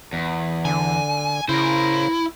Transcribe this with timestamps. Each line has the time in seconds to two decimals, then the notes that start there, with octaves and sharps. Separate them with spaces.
0.13 E2
0.65 D3 G#5
1.49 C#3 E4 A#4 C5